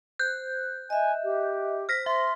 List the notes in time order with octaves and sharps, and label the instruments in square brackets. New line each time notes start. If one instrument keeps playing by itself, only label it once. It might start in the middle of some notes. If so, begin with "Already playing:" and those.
[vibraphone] C5 [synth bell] F#6 G6
[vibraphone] D#5 E5 [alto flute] G#5
[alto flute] G4
[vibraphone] C5 [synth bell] F6 A#6 B6
[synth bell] E5 [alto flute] C6